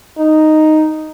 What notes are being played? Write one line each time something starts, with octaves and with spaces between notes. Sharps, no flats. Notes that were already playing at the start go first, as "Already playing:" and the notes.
D#4